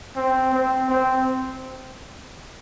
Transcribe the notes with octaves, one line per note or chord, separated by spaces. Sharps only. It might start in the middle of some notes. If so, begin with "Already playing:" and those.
C4
C4
C4